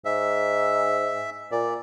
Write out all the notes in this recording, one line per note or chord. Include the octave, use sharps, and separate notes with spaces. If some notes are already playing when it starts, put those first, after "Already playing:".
G#2 E5
A#2 D5